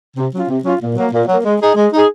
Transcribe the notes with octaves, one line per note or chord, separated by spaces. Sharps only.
C3
F#3 C#4 F4
C3
F#3 C#4 F4
A#2
F#3 A#3
A#2
F#3 A#3
G#3
D#4 G#4
G#3
D#4 G#4